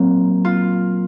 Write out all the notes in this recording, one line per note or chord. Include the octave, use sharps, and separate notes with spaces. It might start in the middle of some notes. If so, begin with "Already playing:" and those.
Already playing: A#2 F#3 C4
F4